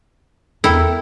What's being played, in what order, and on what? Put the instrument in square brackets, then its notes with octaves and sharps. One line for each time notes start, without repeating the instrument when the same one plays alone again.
[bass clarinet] E2 [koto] E4 [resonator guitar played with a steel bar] A4 A#4 G5